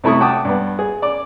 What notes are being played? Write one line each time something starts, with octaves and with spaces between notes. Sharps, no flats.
C3 A3 E4 C#6 D#6
F#5 G5 A5 D6 D#6
G2 B3
G#4
D5 D6